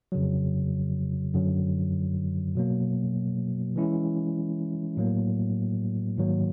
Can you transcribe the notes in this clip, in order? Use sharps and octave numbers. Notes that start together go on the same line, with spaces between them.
F2 C#3 F#3
F#2 D3 F#3
B2 F#3 A#3
E3 G#3 C#4 E4
A2 F#3 A#3
G#2 D#3 F#3 A#3